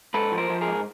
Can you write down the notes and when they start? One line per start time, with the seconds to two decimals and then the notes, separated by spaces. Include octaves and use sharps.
0.14 G#2 A4 B4
0.32 F3
0.38 A#4 C5
0.49 F3
0.61 G#4 A#4
0.67 G#2